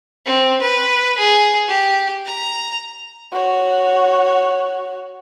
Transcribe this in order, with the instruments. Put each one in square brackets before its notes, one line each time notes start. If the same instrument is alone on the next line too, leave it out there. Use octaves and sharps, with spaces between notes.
[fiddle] C4
B4
G#4
G4
A#5
[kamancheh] F#4 C#5